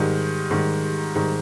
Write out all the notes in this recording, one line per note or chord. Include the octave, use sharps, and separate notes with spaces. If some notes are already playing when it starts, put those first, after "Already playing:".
Already playing: G#2 D#3 G3
G#2 D#3 G3
G#2 D#3 G3